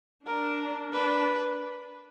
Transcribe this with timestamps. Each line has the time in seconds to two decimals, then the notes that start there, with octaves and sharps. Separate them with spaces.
0.26 D4 A#4
0.92 D4 B4